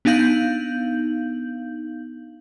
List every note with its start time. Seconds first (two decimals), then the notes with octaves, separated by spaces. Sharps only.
0.05 B3 D4 D#4 F5 G6 F#7